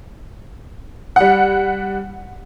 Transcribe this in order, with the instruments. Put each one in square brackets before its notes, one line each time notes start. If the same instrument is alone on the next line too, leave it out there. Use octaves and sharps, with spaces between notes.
[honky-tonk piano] G3 F#5